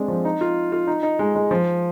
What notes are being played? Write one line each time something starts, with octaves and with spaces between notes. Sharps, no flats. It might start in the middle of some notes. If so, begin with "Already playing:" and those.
Already playing: G#3 C4 D4
F3
D#4
F4
F4
D#4
D#4
G#3
G#3
F3